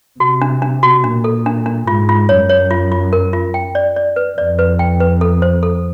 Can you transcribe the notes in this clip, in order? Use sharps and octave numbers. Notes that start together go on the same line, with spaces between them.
C3 F#4
D4
D4
F#4
A#2 D4
A4
D4
D4
G#2 F4
F4
F#2 C#5
C#5
F4
F4
A#4
F4
G5
D5
D5
B4
F2 D5
B4
G5
B4
A4
C5
A4